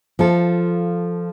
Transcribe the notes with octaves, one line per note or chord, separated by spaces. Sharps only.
F3 F4 A4